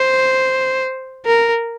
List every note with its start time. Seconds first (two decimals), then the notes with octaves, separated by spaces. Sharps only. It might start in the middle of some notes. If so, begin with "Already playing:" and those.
Already playing: C5
1.26 A#4